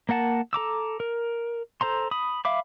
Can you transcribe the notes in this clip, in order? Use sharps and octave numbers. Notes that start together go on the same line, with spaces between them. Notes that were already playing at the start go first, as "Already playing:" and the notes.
A#3 A#4 F#5 A5
A4 A#5 D6 E6
A#4
A4 C5 A#5 C6
B5 D#6
E5 F5 B5 D6